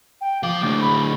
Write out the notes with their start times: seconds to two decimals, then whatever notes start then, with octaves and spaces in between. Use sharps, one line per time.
0.21 G5
0.43 F3 F5 D6
0.63 D2 A2
0.81 B5